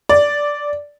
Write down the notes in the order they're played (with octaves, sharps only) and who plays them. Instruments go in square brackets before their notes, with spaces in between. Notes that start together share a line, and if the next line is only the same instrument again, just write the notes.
[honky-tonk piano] D5